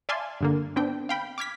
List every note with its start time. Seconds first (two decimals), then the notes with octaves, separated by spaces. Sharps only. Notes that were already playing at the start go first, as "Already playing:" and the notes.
0.09 D5 E5 F5 G#5 A5 C6
0.41 G2 D3 A#3
0.76 B3 C4 D4 G5
1.09 F5 G5 B5
1.38 D6 F6 G#6 B6